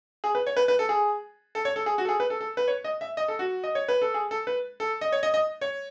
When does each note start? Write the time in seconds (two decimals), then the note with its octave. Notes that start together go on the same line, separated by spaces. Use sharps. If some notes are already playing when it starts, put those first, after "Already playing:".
0.24 G#4
0.35 B4
0.47 C#5
0.57 B4
0.68 B4
0.79 A4
0.89 G#4
1.55 A4
1.65 C#5
1.76 A4
1.86 G#4
1.98 F#4
2.05 A4
2.09 G#4
2.20 B4
2.30 A4
2.41 A4
2.57 B4
2.68 C#5
2.84 D#5
3.01 E5
3.17 D#5
3.28 A4
3.39 F#4
3.64 D#5
3.75 C#5
3.88 B4
4.02 A4
4.14 G#4
4.31 A4
4.47 B4
4.80 A4
5.01 D#5
5.12 C#5
5.23 D#5
5.34 D#5
5.61 C#5